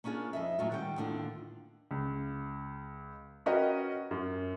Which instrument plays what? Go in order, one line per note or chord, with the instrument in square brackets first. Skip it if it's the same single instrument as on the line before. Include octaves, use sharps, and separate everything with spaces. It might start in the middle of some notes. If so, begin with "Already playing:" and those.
[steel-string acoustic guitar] A#3 C#4 D4 F4 G#4
F2 D#5 E5
A2 F#3 C#4 F4
D#3 G3 F#5 G5
D#2 A2 D3 D4 F4
[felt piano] C#2
C#4 F#4 A#4 B4 D#5 G5
F#2